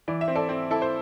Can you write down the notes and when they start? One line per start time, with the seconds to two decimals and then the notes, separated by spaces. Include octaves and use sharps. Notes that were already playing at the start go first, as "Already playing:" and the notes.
0.08 E3 D5
0.21 E5
0.28 C4
0.35 A4 D5
0.49 C4
0.71 E4 A4
0.82 C5